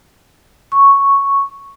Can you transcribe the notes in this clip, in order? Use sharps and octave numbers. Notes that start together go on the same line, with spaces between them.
C#6